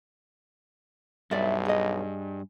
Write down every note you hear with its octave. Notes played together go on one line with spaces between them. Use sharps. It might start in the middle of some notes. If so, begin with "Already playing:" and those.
B1 G2 D5 E5
G#4 D#5